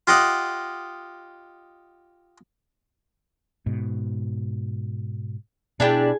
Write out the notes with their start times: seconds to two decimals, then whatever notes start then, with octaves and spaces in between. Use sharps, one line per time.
0.07 F4 G4 D#5 F#5
3.66 G#2 B2
5.80 B2 D4 E4 G4 G#4 G#5